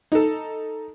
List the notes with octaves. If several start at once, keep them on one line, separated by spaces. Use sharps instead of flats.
D#4 A4